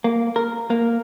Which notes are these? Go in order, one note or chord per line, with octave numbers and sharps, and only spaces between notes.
A#3
A#4
A#3